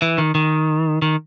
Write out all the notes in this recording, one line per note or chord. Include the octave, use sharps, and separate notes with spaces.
E3
D#3
D#3
D#3